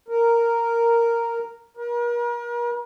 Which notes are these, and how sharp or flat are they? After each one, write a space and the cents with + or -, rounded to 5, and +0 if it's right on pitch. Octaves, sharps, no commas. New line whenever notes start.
A#4 -5
A#4 +40